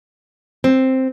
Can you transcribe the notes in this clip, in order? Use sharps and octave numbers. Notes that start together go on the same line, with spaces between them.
C4